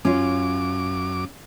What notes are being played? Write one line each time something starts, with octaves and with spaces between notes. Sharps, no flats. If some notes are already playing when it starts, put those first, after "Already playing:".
F#2 C#4 F4 D6